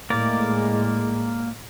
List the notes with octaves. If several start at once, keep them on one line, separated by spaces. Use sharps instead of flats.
A2 G#3 A#3 A#4 D5